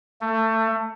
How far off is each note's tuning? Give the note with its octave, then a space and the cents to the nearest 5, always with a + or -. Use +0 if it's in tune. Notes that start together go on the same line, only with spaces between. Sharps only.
A3 +25